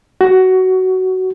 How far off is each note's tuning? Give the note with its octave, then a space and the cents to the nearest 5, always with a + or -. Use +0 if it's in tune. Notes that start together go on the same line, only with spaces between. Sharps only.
F#4 +15